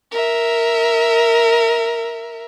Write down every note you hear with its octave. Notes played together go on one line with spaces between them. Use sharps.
A#4 E5